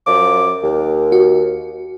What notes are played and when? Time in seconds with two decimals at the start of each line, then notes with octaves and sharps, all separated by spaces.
0.07 F#2 F3 D6
0.63 D#2
1.12 F#4